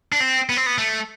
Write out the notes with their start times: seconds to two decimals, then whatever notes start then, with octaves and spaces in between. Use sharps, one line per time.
0.12 D4
0.20 C4
0.50 B3
0.57 C4
0.66 B3
0.78 A3